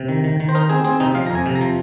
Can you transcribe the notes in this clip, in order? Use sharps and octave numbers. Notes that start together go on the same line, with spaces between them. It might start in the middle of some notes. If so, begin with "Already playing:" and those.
Already playing: C3
D#3
D#3
D#3
C5
D#4 A#4
C4 G#4
C4 G#4
C3 D#4
F3 F5
F2 A#5
G#5
C3
A#5
F3